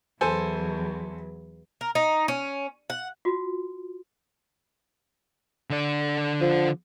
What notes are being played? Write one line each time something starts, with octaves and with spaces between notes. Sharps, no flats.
E2 F#3 A4 C5 G#5
A#4
D#4
C#4
F#5
F4 F#4
D3 D5
F3